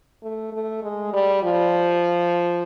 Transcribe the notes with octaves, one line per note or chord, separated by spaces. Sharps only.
A3
A3
G#3
G3
F3